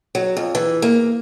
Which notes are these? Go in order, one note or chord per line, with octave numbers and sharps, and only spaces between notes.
F#3
F2
E3
A#3